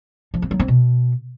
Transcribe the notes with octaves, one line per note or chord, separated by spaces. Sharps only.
F3
C4
F#3
C4
B2